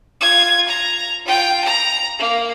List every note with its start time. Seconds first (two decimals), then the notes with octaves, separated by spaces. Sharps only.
0.20 F4 G#6
0.68 A#5
1.25 F4 G5
1.64 A#5
2.19 A#3